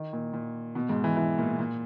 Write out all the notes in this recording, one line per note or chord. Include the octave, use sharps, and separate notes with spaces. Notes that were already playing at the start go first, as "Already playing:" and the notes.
Already playing: D#3
A#2
A#2
B2
G#2
E3
E3
A#2
A#2